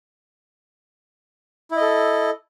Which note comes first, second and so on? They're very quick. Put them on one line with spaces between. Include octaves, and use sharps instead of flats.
E4 D#5 A4